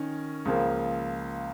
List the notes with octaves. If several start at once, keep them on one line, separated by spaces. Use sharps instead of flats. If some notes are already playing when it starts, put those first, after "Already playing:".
Already playing: D#3 C#4
C#2 C#3 F3 A#3